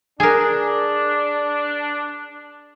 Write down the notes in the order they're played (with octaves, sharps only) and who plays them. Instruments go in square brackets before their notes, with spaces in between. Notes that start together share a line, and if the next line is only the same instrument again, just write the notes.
[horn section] D4 [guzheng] G#4 A#4